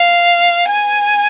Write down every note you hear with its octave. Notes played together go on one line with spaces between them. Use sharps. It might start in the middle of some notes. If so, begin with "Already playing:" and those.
Already playing: F5
G#5